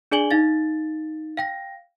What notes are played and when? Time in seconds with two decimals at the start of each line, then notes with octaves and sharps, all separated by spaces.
0.12 D4 G#4 D5 G#5 F#7 G7
0.31 D#4 F5 A6
1.37 F5 G5 A#6